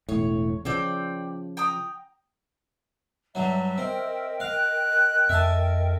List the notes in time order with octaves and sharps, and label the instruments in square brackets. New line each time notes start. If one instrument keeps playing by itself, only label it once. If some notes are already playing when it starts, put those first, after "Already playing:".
[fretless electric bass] E1 A2 [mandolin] C#5
[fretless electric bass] C#3 F3 [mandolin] C4 D5 G5
[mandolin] G5 A#5 D#6
[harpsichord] G2 F#3 [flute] E5
[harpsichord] C4 [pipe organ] A#4 D#5 G5
[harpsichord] F5 [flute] F#6
[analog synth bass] F2 [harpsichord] E5 G#5 A5